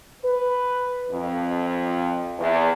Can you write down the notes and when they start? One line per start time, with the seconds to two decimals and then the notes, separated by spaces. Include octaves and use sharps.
0.22 B4
1.10 F2
2.38 E2